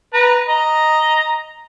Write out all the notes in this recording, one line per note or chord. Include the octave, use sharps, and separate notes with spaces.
B4 A#5
D#5 A#5